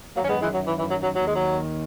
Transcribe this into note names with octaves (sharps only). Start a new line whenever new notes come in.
F#2 D#3 F#3 A#3 C#4
G#3 B3
E3 G#3
F#3
E3
E3
F#3
F#3
D#2 D#3 F#3
G#3
F#3